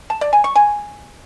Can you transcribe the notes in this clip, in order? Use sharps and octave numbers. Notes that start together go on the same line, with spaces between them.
A5
D5
G#5
C#6
G#5